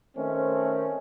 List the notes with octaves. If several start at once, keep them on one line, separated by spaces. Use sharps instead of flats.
D#3 A3 C4 C#4